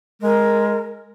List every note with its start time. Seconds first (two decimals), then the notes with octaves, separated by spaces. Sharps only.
0.22 G#3 A#4